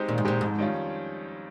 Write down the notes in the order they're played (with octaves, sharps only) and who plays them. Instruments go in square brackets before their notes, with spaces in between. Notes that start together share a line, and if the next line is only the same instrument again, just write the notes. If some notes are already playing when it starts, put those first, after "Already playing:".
Already playing: [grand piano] G#3 C4 D#4 G4
[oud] A#2 [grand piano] D#3
[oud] G#2
[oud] A#2 [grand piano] G#3 C4 D#4 G4
[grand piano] F2 [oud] G#2
[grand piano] D#3 G3 C#4 F4